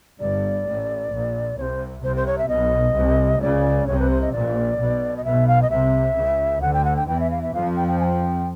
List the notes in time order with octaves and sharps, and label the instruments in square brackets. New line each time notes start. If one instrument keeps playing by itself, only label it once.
[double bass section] G1 G2 [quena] D5
[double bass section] A1 A2
A#1 A#2
[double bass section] C2 C3 [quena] C#5
[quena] C5
[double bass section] C2 C3 [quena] C5
[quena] C5
C#5
E5
[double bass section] B1 B2 [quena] D#5
[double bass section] C2 C3
[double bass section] C#2 C#3 [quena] D5
[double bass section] C2 C3 [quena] C#5
[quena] B4
C5
D#5
[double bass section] A#1 A#2 [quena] D5
[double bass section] B1 B2
[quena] D#5
[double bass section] B1 B2 [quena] E5
[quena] F5
D#5
[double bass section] C2 C3 [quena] E5
[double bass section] C#2 C#3
[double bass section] D2 D3 [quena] F#5
[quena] G5
F#5
G5
[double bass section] E2 E3 [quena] G5
[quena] E5
F5
E5
[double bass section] F2 F3 [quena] F5
[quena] G5
G5
G#5
G5